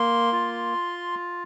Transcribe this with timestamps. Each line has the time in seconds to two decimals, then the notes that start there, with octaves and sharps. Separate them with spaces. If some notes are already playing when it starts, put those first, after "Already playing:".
Already playing: A#3 C6
0.32 F4